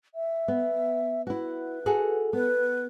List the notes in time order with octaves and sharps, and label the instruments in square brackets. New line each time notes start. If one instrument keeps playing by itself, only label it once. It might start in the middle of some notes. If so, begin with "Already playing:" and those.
[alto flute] E5
[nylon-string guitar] B3
[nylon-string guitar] E4 F#4 [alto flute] B4
[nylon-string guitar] F#4 G#4 A4
[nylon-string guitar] B3 [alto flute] B4